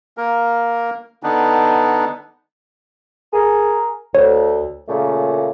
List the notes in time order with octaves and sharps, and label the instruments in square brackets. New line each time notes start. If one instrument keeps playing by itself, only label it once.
[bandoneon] A#3 A#4
D3 B3 D4 D#4
[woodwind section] G#4 A#4
[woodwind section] D2 [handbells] C#5
[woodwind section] A#2 C#3 A3